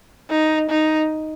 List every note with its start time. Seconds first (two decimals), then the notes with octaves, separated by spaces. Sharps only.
0.30 D#4
0.69 D#4